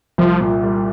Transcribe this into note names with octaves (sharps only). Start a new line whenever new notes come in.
C2 F3
A#2
G3